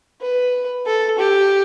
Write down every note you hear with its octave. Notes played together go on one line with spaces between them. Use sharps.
B4
A4
G4